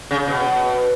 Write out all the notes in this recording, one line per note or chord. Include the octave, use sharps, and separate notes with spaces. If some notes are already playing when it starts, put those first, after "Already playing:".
C#3
B2